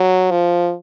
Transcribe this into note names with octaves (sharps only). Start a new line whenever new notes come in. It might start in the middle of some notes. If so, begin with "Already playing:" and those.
Already playing: F#3
F3